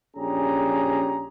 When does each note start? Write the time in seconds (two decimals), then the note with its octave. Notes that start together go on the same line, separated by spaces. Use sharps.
0.16 A#1 C#4 D4 G4 G#4 A#5